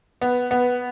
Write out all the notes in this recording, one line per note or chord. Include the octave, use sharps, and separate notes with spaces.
B3
B3